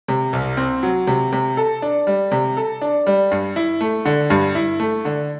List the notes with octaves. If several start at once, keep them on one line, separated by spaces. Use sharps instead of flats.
C3
C2
C4
F#3
C3
C3
A4
D4
G3
C3
A4
D4
G3
G2
E4
A3
D3
G2
E4
A3
D3